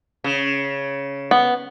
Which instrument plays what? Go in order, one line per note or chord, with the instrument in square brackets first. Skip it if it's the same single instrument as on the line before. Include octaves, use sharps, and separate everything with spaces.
[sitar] C#3
[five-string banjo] B3